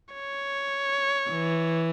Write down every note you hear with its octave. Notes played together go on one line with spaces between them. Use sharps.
C#5
E3